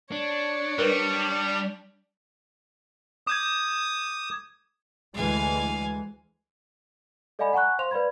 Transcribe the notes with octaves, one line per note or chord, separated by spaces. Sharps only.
D4 C#5
G3 A#4 B4
D6 D#6 G6 G#6
D2 E3 G#3 F5 G#5
A4 D5 D#5 F5 G#5 B5
F#5 G#5 A#5 C#6 F#6
C5 F5 C6 F7
B4 D5 F5 B5 G#6